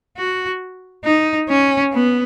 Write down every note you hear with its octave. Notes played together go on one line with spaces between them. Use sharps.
F#4
D#4
C#4
B3